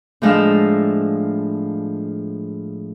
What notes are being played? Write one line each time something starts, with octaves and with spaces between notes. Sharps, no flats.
A2 F3 G#3 D4 F5 E6